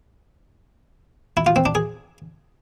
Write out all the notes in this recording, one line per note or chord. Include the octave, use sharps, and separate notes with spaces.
E4
F4
C4
D4
G#4